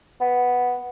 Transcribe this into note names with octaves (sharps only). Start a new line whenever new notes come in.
B3